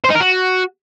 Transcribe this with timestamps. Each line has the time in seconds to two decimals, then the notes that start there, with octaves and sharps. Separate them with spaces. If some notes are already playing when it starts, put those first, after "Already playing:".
0.05 C5
0.10 D#4
0.15 A#4
0.21 F#4